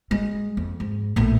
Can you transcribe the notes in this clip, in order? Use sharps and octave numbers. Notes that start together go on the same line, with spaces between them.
G#3
F2
G#2
A#1 A2